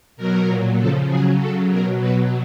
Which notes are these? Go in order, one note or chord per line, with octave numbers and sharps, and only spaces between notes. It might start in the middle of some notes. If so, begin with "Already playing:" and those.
B2 F#3 A#4
A#2 F#3
C#3 F3 A4
C#3 F#3 G#4
C#3 F#3 A4
B2 F#3 A#4
B2 F#3 B4